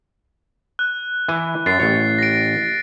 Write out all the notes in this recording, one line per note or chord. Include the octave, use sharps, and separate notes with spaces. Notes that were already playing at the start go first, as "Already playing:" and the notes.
F#6
E3 G#5
F#2 A6 C7
A1 C#5
A#6 D7